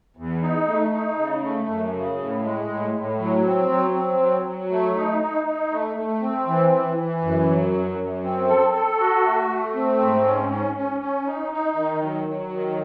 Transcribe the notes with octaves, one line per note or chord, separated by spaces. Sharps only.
E2
D#4
A3
D#4
C#3
A3
F#2
C#3
A2
G#3
A2
A2
F#3
C4
F#3
C4
F#3
F#3
A3
D#4
D#4
D#4
A3
A3
C4
E3
E3
E3
F#2
F#3
F#2
F#2
C4
A4
A4
F#4
A3
A3
C4
G#2
C#4
C#4
C#4
C#4
D#4
D#4
D#3
F#3
F#3
D#3